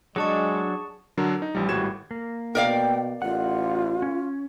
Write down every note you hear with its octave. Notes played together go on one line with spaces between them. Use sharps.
F#3 G#3 D4 G#4 A5 C#6
D3 F#3 D4 A4 A#4
D#4
A1 F3 G3
G#1 A2 G3 F#4 G#6 E7
A#3
B2 A#4 D5 F5 G5
A1 F4 F#5
C#4